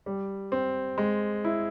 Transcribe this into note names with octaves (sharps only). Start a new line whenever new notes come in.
G3
C4
G#3
E4